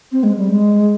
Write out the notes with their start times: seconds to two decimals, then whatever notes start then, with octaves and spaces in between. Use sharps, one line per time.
0.12 C4
0.23 G#3
0.37 G3
0.49 G#3